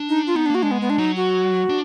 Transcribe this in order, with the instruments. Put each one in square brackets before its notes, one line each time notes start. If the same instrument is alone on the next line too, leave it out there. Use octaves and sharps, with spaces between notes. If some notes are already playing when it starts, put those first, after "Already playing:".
Already playing: [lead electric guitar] D4
[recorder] D#4
F4
[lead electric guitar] B3 [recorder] D#4
[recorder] D4
[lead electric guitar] A#3 [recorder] F#4
[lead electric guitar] G#3 [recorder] D4
[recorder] B3
B3
D4
[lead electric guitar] F#3 [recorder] D#4
[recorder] F#4
[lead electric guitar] D4